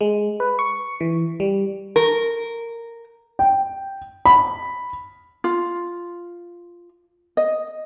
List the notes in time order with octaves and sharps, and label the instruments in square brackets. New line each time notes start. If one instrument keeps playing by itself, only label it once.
[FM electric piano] G#3
B4
C#6
E3
G3
[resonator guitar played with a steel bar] A#4
[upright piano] G5
B5
[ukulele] F4
D#5